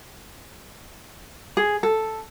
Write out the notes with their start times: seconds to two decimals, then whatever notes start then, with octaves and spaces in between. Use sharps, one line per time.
1.57 G#4
1.83 A4